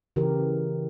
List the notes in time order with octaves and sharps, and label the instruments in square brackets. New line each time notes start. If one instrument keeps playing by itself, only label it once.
[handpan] C#3 E3 G4 A#4